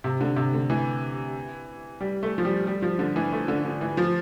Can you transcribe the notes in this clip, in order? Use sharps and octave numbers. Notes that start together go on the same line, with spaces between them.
C3
D3
C3
D3
E3
G3
A3
F3
G3
G3
F3
D3
E3
A3
D3
D3
E3
F3